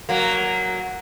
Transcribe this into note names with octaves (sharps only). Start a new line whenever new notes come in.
F#3 A#3